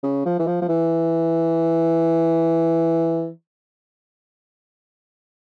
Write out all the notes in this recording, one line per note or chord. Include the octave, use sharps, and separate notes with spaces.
C#3
F3
E3
F3
F3
E3